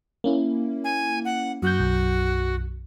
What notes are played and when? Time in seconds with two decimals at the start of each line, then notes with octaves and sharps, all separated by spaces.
0.24 A#3 C#4 E4
0.84 G#5
1.25 F#5
1.62 F#2 F#4 F#6 G6
1.79 B1 F#2